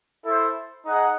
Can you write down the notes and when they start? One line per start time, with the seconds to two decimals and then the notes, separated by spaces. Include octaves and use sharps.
0.24 E4 A4 C5
0.86 D#4 G#4 D#5 F#5